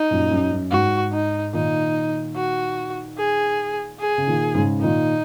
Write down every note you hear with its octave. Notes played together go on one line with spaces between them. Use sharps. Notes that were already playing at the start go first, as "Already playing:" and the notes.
Already playing: D#4
F#2 A#2
F#2
F#2
G#2 F#4
D#4
A#2 D#3 D#4
F#4
G#4
G#4
C#3
A#2 D#3
G#2 C#3
A#2 D#3 D#4